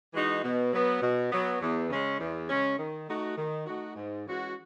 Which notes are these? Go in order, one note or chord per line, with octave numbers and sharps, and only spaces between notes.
E3 G#3 D#4 F#4
B2
F#3 B3
B2
F#3 B3
E2
C#3 G#3 C#4
E2
C#3 G#3 C#4
D#3
A3 D#4 F#4
D#3
A3 D#4 F#4
G#2
E3 G#3 C#4 F#4